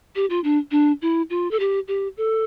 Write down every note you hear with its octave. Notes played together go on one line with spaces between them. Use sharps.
G4
F4
D4
D4
E4
F4
A4
G4
G4
A4